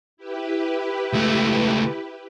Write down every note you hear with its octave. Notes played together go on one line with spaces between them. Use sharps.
E4 G4 B4
C#2 A3